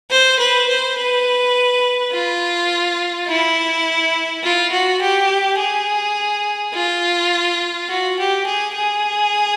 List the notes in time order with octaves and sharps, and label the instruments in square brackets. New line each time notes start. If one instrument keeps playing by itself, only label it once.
[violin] C5
B4
C5
B4
F4
E4
F4
F#4
G4
G#4
F4
F#4
G4
G#4
G#4